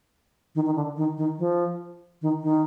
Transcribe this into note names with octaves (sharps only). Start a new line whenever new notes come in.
D#3
D#3
D3
D#3
D#3
F3
D#3
D#3